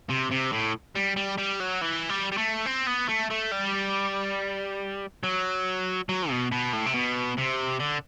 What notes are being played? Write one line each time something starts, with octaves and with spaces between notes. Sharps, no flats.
C3
C3
A2
G3
G3
G3
F#3
E3
G3
G3
A3
C4
B3
A3
A3
G3
F#3
F#3
B2
B2
A2
C3
B2
C3
D3